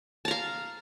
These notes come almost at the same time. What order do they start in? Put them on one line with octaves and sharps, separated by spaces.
A5 A#5 F5